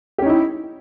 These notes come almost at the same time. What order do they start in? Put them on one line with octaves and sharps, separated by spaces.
G4 C#4 D#4 E4